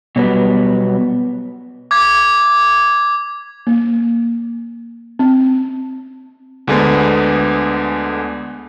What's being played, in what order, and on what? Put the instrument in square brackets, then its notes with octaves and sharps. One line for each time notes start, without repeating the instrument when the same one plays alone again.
[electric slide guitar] B2 F#3 G3 B3
[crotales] D6 G#6
[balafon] A#3
C4
[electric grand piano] D2 D3 G#3 B3